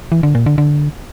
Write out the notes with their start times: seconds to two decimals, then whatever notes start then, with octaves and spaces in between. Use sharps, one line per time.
0.12 E3
0.23 D3
0.35 A#2
0.46 D3
0.58 D3